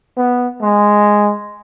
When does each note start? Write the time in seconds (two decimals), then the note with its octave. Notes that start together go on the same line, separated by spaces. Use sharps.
0.17 B3
0.62 G#3